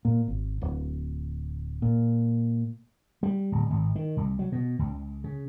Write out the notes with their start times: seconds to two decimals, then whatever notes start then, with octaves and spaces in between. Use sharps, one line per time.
0.05 A#2
0.28 G#1
0.61 D1
1.82 A#2
3.23 G3
3.52 D1
3.70 G#1
3.95 D#3
4.17 C2
4.39 F#3
4.52 B2
4.79 C#2
5.24 C#3